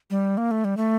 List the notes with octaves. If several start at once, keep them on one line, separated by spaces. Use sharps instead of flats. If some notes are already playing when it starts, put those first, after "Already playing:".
G3
A#3
A3
G3
A3